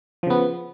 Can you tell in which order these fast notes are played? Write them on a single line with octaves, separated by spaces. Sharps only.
F3 C#3 B3